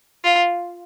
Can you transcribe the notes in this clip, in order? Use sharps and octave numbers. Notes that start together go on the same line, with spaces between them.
F4